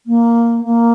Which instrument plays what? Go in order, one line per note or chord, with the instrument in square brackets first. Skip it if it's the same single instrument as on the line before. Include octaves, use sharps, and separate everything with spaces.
[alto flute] A#3
A#3